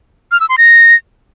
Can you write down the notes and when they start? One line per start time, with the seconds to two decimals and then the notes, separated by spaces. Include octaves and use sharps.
0.32 F6
0.40 E6
0.49 C6
0.58 A#6